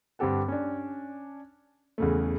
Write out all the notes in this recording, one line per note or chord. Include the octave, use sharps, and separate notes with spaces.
G2 D3 C4 G4 A4 F#5
C#4 D4
E2 C#3 A3